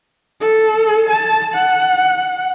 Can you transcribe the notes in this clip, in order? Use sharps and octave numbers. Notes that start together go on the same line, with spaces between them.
A4
A5
F#5